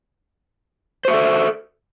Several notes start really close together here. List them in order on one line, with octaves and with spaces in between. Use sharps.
C5 F#4 E5 A4